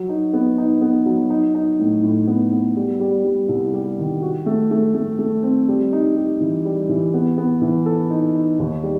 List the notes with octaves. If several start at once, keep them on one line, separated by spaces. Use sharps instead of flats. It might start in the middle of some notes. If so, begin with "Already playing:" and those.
Already playing: F#3
D#4
B3
D#4
B3
F#3
D#4
D#4
A2
A2
B3
B3
G3
G3
G3
C2
G3
D#3
F#4
A3
A3
A3
A3
C4
G3
D#4
G4
E3
G3
E3
B3
B3
E3
A4
D#4
D#4
D#2
G3